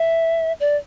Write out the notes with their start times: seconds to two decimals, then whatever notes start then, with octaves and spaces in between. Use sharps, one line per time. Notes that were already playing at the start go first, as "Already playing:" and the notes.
Already playing: E5
0.60 D5